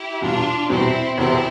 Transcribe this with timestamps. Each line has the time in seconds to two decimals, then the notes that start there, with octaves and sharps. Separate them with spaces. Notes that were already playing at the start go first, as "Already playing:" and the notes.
Already playing: E4 G4
0.21 E2 B2 G3 D4 F4
0.69 E2 B2 G3 C4 E4
1.17 E1 E2 C3 E3 B3 C4 E4